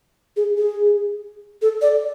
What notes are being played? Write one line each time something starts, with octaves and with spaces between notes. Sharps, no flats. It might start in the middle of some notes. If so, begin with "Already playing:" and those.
G#4
G#4
A4
D5